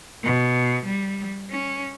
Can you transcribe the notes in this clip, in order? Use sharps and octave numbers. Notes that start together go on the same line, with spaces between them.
B2
G3
C#4